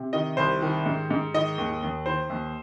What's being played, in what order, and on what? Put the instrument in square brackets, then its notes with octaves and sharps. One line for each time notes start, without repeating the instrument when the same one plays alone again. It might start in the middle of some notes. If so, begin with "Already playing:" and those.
Already playing: [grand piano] C3
D#3 D#5
C2 C5
D#3
G#2
G#2
D#3 D#5
D#2
D#2
D#3 C5
D#2